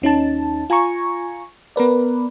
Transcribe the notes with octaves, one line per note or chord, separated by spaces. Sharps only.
D#2 C#4 D#4 A5
F4 G#5 A#5 C#6
B3 A#4 B4 D5